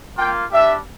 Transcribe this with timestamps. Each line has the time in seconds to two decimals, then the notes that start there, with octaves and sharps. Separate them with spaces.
0.18 A#3 F4 G5
0.52 G3 D4 G4 E5